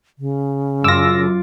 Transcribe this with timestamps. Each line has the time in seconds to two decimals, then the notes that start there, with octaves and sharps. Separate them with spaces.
0.19 C#3
0.84 F#2 F4 D6 E6 A#6